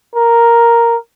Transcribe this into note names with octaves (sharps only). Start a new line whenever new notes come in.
A#4